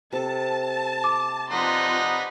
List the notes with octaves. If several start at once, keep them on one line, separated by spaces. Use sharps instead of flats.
C3 A4 A5
D6
F3 B3 C4 D4 D#4 C6